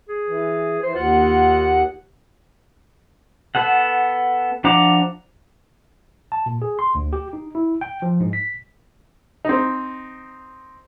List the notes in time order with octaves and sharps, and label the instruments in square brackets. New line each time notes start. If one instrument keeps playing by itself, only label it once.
[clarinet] G#4
[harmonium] E3
[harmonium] E3 [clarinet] C5
[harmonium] D#2 F#5 [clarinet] F4
[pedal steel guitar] B3 A4 F#5
F3 D4 F#5 A#5 D6
[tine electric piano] A5
A#2
G#4
C6
D2
G4
D#4
E4
G5
F3
G#2
B6
[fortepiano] C4 D#4